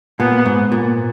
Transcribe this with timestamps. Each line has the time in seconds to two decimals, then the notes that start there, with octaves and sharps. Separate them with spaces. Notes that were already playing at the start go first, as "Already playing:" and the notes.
0.20 A#2 B3
0.45 G#2
0.72 A#2